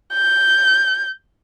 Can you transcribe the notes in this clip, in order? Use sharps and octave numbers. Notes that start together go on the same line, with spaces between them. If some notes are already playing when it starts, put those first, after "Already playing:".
G6